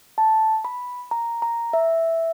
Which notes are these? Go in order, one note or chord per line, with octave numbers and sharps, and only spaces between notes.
A5
B5
A#5
A#5
E5